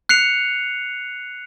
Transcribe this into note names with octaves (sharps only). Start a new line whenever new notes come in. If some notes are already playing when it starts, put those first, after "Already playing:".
F#6 C7 C#7 F7